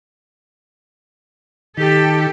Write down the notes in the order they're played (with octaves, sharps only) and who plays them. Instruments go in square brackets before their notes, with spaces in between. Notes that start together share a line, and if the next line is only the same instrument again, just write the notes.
[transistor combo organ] D#3 [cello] G4 A4